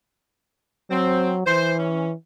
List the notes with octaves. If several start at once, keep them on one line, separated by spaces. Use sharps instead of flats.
F#3 C4
E3 C5
C#4